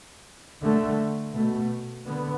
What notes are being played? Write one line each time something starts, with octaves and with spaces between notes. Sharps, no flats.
D3 A3
B2 A3
D3 B3